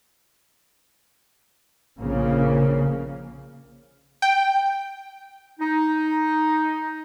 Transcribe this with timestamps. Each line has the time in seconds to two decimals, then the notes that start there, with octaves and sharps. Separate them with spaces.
1.97 A#1 C#3 A#3
4.22 G5
5.60 D#4